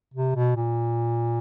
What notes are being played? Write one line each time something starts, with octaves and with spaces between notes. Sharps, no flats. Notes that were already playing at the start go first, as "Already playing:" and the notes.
C3
B2
A#2